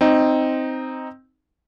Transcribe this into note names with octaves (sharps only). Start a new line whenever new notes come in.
C4 D#4